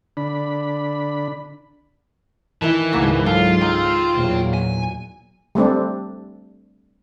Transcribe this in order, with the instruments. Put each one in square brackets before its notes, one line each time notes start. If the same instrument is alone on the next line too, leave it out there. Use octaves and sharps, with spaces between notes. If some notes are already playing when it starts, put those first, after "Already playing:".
[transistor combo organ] D3 D4 B5
[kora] D#3 E4 [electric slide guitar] E3 [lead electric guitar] A5
[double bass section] C#2 G#2 [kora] A#3 F#4
[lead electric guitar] F#3 [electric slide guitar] F4 [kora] A4
[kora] D#4 [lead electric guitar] G5 C6
[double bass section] E2 A#2 F#3
[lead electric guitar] G#5
[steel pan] G3 A3 C4 D4